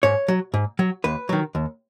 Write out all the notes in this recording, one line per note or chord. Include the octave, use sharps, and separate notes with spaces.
G#2 C#5
F#3
G#2
F#3
D#2 B4
D#3 F#3
D#2